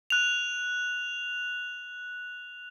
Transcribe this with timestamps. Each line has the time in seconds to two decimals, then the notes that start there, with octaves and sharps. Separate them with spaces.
0.10 F#6 F7